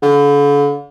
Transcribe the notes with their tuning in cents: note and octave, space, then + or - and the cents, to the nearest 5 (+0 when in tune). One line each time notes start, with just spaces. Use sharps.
D3 -40